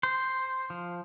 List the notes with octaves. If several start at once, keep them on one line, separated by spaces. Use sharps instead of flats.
C5
F3